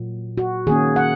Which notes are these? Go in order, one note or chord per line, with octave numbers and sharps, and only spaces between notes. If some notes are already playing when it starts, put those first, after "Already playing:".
Already playing: A#2 F#3
F#4
D#3 A#3 C#4 G#4
F#5